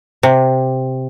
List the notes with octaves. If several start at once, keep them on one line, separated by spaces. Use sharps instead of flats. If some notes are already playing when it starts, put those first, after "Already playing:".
C3